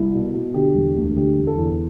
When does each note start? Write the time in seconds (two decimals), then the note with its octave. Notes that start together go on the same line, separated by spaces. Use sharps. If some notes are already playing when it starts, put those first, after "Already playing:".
Already playing: C2 E4
0.13 B2
0.34 B2
0.54 D3 G4
0.75 E1
0.95 D2
1.16 D3 G4
1.36 E1
1.47 A4
1.58 E2